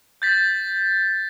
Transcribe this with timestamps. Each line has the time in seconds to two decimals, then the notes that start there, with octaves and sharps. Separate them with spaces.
0.22 G6 A6 B6